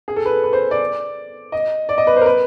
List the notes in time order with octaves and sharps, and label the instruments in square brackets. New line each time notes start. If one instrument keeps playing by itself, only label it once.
[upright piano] G#4
A4
B4
B4
C5
D5
D#5
D5
D#5
B4
C5
A#4
B4